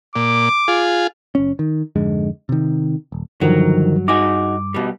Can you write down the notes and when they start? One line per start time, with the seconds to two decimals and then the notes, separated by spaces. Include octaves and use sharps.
0.16 A#2 D6
0.68 F4 G#4
1.35 F#1 C#4
1.59 D#3
1.96 F2 G#2 D3 G#3
2.49 C3 D#3
3.12 D#1
3.41 G2 D3 D#3 F3 F#3
4.08 D#4 F#4 G#4 D6
4.74 B2 G3